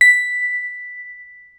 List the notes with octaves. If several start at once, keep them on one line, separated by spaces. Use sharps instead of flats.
B6